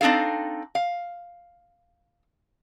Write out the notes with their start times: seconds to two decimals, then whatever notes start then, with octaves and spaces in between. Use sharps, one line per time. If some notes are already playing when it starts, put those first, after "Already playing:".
0.01 C4 D4 D#4 A4 F5
0.75 F5